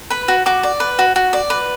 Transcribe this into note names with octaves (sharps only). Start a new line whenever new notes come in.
B4 B5
F#4
F#4 D6
D5
B4
F#4
F#4
D5
B4